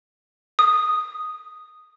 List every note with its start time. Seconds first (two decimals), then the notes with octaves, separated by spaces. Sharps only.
0.59 D#6